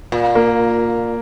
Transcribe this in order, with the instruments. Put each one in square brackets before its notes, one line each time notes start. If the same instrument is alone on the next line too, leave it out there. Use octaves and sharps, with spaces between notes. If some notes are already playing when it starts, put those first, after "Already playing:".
[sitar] A#2
[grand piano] A#3